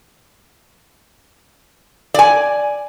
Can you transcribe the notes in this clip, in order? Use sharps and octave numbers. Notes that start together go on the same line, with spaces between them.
D5 G#5